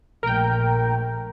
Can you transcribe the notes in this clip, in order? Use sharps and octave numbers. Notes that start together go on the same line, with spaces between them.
A#1 A#2 A3 A#4 G5